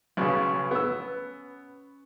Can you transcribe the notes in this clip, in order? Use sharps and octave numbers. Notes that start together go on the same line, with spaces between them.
B1 C#3 C#4 B4
B3 E6